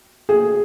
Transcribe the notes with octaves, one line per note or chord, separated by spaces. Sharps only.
G#4